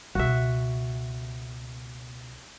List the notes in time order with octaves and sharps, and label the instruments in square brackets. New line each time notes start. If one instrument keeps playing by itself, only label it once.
[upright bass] C#2 B2 [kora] F#4 E5